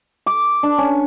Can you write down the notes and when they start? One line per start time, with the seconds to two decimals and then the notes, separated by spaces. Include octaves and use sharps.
0.26 D6
0.63 D4
0.78 C#4